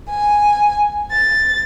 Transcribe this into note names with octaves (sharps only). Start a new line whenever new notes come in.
G#5
A6